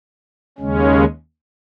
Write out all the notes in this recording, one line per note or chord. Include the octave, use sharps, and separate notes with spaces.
D#2 C#3 G#3 C#4